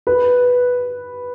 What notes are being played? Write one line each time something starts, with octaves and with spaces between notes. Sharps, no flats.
B4